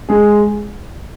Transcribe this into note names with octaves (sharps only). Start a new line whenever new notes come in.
G#3 G#4